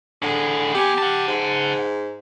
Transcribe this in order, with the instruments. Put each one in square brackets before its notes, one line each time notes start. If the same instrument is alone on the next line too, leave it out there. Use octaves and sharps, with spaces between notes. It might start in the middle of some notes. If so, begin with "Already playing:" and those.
[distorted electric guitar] A2 G#4 [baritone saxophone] D3
[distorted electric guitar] B3 G#5 [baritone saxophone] G4
[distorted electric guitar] F#5 A5
[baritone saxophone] G#2